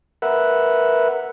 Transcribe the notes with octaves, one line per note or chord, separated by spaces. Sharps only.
A#4 B4 E5 F#5